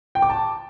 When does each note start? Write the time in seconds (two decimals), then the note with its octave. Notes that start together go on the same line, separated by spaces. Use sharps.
0.15 G5
0.22 D6
0.30 A5